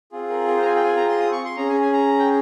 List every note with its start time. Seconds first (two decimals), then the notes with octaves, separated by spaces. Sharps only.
0.12 C4 F4 G#4
0.30 A#4
0.48 A#4
0.57 C5
0.62 A#5
0.65 G#5
0.76 G5
0.84 G#5
0.97 A#5
1.09 C6
1.20 D#6
1.32 C#6
1.45 C6
1.56 C#4 G#4 A#5
1.69 G#5
1.81 G#5
1.93 A#5
2.19 G5